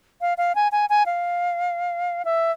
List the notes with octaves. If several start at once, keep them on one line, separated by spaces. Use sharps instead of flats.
F5
F5
G#5
G#5
G#5
F5
E5